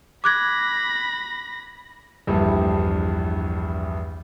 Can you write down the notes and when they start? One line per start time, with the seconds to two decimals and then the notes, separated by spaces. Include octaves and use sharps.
0.24 B5 D6 F#6 G#6 A#6
2.27 A#1 E2 G2 E3 G3 A3